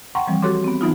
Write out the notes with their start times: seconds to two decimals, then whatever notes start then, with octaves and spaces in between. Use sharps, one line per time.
0.15 F#5 G5 A#5 C6 C#6
0.27 E3 F3 G3 C4
0.42 F#4 G4 A4 C#5 C6 D6
0.64 B3 C4
0.81 E3 F#3 B3 D#4 F4